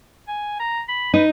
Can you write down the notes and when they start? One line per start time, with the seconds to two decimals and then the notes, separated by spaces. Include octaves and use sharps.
0.28 G#5
0.60 A#5
0.88 B5
1.14 D#4 B4